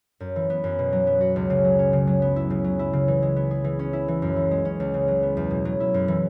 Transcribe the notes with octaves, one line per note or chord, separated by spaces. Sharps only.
F#2
E3
B3
F#2
B2
F#3
B3
F#4
C#2
C#3
F#3
C#4
C#3
F#3
B3
E4
C#3
F#3
E4
C#3
E3
G#3
B3
G#4
E3
C#4
E4
E3
F#2
E3
G#3
C#4
C#2
C#3
F#3
B3
E2
B2
F#3
E4
F#2
E3